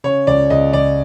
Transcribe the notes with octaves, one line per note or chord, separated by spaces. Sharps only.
C#3 C#5
C#2 D5
C#2 D#5
C#2 D5